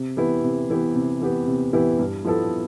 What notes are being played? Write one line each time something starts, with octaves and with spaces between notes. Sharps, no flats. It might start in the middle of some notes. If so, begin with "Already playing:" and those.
Already playing: C3
E3 B3 E4 G4
C3
E3 B3 E4 G4
C3
E3 B3 E4 G4
C3
E3 B3 E4 G4
G2
F3 B3 E4 A4